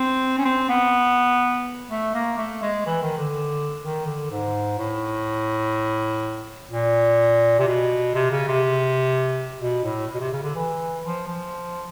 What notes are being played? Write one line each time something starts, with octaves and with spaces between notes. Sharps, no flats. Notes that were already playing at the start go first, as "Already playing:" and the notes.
Already playing: C4
C#4
C4
B3
A3
A#3
A3
G#3
E3
D#3
D3
D#3
D3
G#2
A2
A#2
C3
B2
C3
C#3
C3
B2
A2
B2
C3
C#3
D3
E3
F3
F3